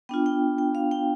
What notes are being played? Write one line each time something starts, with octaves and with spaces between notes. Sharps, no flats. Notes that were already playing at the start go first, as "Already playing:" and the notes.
B3 D4 F4 G5
G5
G5
F5
G5